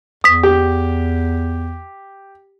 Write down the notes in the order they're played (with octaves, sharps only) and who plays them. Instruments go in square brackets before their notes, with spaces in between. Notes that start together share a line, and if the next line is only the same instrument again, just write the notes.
[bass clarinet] E2 [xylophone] D#6 B6
[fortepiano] G4